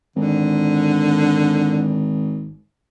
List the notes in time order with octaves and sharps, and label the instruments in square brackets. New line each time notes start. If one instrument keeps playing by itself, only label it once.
[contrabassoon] G#1 [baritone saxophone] D3